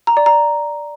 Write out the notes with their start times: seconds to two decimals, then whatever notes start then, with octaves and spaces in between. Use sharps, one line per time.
0.07 A#5
0.17 D5
0.26 A#5